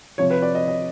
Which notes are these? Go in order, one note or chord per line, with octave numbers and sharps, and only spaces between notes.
C3 F3 C#5
B4
D5
D#5
D#5